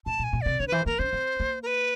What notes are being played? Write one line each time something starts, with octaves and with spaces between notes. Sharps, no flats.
A2 A5
A#2
G#5
A#2
C3 D5
D3 C#5
B4
E3 C5
A#3 A#4
C#4 C5
C4
A#3
A#4
B4